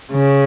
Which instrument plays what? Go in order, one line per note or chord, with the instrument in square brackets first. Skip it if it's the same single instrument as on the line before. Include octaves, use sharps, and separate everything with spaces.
[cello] C#3